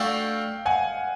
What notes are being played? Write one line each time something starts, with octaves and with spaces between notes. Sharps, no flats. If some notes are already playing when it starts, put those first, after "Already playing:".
Already playing: A3 D4 F#4 A4 F5 G5
F#5 G#5